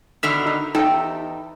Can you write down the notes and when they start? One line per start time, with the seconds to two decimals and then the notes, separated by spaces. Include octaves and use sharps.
0.23 B2 D3 D#3 E5 F6
0.46 D#4
0.75 E2 D#4 G4 A4 G5